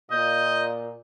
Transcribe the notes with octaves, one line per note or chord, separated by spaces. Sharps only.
A#2 D#5 G6